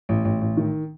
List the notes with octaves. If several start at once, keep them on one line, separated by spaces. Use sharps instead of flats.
A1
A1
A1
D#3